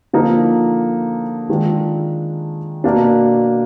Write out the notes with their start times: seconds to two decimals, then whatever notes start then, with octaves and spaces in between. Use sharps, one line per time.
0.13 D3 F3 A#3 D#4
1.49 D#3 G#3 D4 F4
2.84 B2 A#3 D4